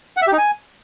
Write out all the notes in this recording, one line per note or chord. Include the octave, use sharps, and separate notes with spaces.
F#5
E5
G4
D#4
G#5